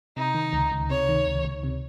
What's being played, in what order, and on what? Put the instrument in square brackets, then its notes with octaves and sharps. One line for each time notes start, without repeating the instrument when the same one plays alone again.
[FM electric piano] C3 [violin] D#4
[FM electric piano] D#3
C#2
C#2
[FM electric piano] C3 [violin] C#5
[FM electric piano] D#3
C#2
C#2
C3